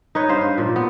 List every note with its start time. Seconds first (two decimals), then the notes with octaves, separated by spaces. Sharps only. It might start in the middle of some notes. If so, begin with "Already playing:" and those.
0.15 D#4 B4 C#5
0.29 G2 B4 C5 F5
0.41 C5
0.58 A#2 F3
0.76 B3